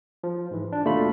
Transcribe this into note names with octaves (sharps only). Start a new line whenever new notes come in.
F3
G#2 E3
D4
D#2 B2 A3 D4 F4 B5